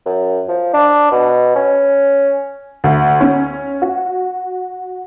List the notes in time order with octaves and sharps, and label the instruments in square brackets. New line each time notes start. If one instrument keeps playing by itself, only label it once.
[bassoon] F#2
F3
D4
B2
C#4
[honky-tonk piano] D2
C#4
F#4